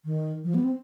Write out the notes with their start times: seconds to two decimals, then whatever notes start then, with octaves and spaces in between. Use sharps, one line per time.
0.05 D#3
0.44 F3
0.54 B3
0.64 C4